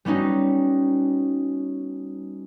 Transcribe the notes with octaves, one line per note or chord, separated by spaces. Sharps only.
G3 B3 C#4 D#4 F#4